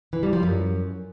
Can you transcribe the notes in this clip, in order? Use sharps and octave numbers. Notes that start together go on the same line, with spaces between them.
E3
G3
F3
F#2